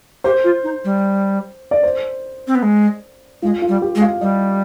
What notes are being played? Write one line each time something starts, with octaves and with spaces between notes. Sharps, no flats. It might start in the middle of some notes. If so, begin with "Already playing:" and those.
G4 C5
F4
D#4
G3
D5
C5
C4
B3
G#3
G#3 F4
F4
G3
G4
G#3
F5
G3 D#5